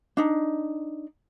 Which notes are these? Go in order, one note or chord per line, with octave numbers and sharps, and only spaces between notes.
D4 D#4